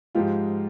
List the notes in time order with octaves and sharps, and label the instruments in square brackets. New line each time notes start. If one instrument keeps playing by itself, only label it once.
[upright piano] G#2 F3 G#3 F4 G4